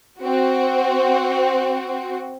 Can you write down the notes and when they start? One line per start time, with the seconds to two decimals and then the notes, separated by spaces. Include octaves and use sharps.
0.19 C4 F#4